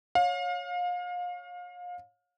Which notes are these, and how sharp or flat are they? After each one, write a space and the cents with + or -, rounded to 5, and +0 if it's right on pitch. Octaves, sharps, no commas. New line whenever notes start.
C#5 +0 F5 +30